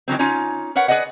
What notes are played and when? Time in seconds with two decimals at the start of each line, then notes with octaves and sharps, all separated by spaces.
0.08 D#3 E3 F#3 C4
0.19 C#4 D#4 F4 C#5
0.75 A#4 B4 C#5 F#5
0.88 G#4 B4 D5 D#5 F#5